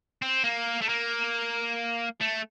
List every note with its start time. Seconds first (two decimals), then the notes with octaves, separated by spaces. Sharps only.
0.22 C4
0.44 A#3
0.81 A3
0.89 A#3
2.21 A3